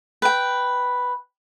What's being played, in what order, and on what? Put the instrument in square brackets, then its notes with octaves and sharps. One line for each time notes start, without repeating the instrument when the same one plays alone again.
[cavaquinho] B4 G5